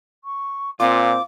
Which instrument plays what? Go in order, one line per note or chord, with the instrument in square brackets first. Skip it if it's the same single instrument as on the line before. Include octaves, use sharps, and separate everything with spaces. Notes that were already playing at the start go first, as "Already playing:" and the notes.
[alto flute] C#6
[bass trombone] A#2 [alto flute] C4 [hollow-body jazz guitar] F4 [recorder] D6